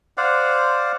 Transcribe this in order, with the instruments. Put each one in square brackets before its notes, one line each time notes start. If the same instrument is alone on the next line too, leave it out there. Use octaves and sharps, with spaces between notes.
[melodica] C5 D5 F5 F#5